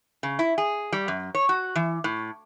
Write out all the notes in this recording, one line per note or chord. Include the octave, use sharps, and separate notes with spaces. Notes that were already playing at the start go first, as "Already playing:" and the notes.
C#3
E4
G#4
G3
F#2
C#5
F#4
E3
A2